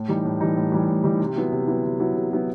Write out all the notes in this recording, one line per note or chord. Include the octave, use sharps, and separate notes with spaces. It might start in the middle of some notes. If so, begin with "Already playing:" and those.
Already playing: A2
E3 G3 D#4
A2
E3 G3 D#4
A2
E3 G3 D#4
A2
E3 G3 D#4
C3
F#3 B3 E4
C3
F#3 B3 E4
C3
F#3 B3 E4
C3
F#3 B3 E4